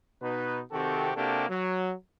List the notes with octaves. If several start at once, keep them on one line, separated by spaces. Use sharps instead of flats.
B2 D#4 B4
C3 D#3 C4 F#4 G4 A4
C3 A#3 D4 F#4 G4 A4
F#3